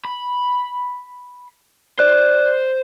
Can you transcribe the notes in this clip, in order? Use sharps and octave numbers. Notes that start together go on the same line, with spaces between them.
B5
C5 D5 F#6